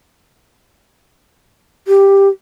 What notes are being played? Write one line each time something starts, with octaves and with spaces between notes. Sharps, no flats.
G4